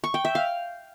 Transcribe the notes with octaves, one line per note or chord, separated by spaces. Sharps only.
C#6
G5
E5
F5